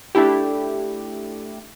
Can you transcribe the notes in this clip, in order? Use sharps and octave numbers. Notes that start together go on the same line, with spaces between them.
A3 D4 E4 G4